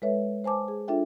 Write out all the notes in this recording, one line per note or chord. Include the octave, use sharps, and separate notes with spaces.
G#3 A4 B4 C#5 E5
C5 G#5 A5 D6
G#4
D4 F4 A4 E5 G5